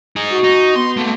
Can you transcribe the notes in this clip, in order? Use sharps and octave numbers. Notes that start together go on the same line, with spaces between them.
D#4 G#4
F#4
D#4
B3 C6
A3 A#3